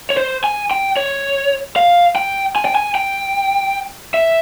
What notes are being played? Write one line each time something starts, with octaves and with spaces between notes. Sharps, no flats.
C#5
C5
G#5
G5
C#5
F5
G5
G#5
G5
G#5
G5
E5